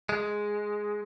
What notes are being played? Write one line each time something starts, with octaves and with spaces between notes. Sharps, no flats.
G#3